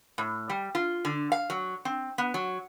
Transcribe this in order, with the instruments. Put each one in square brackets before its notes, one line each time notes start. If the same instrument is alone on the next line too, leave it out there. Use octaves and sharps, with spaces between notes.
[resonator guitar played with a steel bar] A2
G3
F4
D3
F5
F#3
C4
B3
F#3